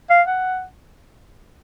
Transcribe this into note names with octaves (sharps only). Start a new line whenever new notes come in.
F5
F#5